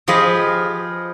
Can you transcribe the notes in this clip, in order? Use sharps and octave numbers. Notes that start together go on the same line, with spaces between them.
F3 F4 G4 G#4 B4 D#5